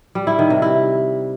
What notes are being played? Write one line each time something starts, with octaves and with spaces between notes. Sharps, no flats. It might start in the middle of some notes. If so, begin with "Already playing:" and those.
G3
E4
D#3
C3
E4